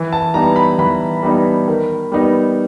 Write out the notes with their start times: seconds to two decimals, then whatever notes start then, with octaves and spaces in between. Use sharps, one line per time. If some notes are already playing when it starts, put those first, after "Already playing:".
Already playing: E3
0.13 A5
0.34 G3 B3 D#4 A#5
0.56 B5
0.79 E3 B5
1.23 G3 B3 D#4
1.68 D#3
2.12 G3 B3 D#4